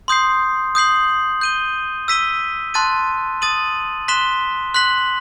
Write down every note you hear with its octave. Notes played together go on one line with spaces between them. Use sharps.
C6 D#6 G6 C7
D#6 G6 C7 F#7
G6 D#7 G7
E6 B6 D#7 G7
A5 C6 F#6 A6 D#7
D#6 A6 D#7 F#7
C6 F#6 B6 E7 G7
C6 F#6 B6 F#7